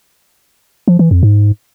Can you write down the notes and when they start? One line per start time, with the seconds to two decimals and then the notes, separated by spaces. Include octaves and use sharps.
0.88 F3
0.99 E3
1.11 F2
1.23 G#2